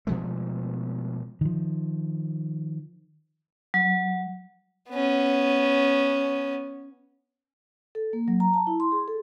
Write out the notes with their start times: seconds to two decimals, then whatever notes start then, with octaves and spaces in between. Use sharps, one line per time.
0.07 B2 F3 G#3 A3
1.41 D#3 F3
3.74 F#3
4.89 B3 C#4
7.95 A4
8.13 A#3
8.28 F#3
8.40 A#5
8.54 A5
8.67 E4
8.80 C6
8.92 G#4
9.08 A4